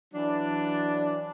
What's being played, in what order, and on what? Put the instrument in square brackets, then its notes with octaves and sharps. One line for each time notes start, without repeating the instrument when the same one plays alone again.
[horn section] E3 F#3 D4